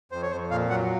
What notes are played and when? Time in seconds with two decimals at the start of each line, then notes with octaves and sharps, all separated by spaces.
0.12 F2 C5
0.22 C#5
0.31 F2 C5
0.50 A#2 F5
0.70 F#3 F#5